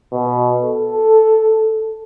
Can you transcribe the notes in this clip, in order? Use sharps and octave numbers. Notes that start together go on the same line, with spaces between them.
B2
A4